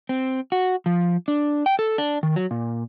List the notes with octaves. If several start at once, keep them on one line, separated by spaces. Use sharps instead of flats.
C4
F#4
F3
D4
G5
A4
D4
D#3
F#3
A#2